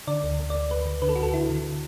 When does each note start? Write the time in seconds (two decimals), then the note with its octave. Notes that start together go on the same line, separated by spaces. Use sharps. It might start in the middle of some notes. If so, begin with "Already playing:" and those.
0.07 D3 D5
0.23 D2
0.40 D2
0.50 D5
0.55 D2
0.71 D2 B4
0.86 D2
1.02 D3 B4
1.09 A4
1.16 D2 F#4
1.23 A4
1.33 D3 E4
1.49 D3